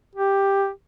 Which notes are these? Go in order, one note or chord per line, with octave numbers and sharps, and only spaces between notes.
G4